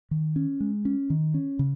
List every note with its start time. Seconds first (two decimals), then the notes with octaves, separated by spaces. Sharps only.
0.11 D#3
0.36 C#4
0.60 G#3
0.85 C#4
1.10 D#3
1.34 C#4
1.59 C#3